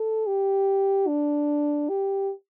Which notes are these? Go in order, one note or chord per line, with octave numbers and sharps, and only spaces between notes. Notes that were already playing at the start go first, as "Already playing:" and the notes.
Already playing: A4
G4
D4
G4